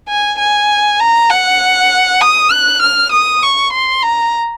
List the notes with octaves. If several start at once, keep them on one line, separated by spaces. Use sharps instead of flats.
G#5
G#5
A#5
F#5
D#6
F#6
F6
D#6
C#6
C6
A#5